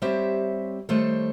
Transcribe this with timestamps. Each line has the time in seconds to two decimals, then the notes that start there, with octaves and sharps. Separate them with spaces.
0.02 G3 C4 G4 C5 C#5 E5
0.89 D#3 G3 A3 A4 C5 C#5